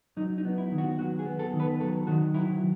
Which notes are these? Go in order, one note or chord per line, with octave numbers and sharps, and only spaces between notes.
F#3 D#4
D#4
B3
E4
D#3
F#4
F#3 F#4
G#4
B3
A4
D#3
B4
F#3 A4
D#3 F#4
F#3 E4